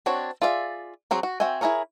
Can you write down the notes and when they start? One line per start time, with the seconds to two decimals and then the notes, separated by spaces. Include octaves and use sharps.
0.06 C4 D4 F#4 C#5
0.42 F4 G#4 D5 E5
1.11 F#3 C4 F#4 G#4
1.23 F#4
1.40 C4 F#4 E5 G5 G#5
1.61 E4 F#4 G#4 A#4 C#5